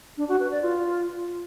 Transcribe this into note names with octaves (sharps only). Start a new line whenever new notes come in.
D4
F#4
B4
D5
F4